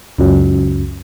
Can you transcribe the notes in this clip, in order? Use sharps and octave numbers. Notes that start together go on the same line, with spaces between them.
C#2 F#2